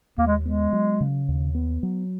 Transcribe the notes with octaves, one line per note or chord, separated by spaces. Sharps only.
D#2 A#3
G#3
G#3 B3
F#3
C#3
D#2
B3
F#3